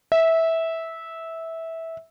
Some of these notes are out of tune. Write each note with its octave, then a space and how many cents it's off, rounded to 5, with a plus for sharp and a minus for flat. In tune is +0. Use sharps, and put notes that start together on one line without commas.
E5 -15